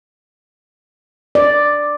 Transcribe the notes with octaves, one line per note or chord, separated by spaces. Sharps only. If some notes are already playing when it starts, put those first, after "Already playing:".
D5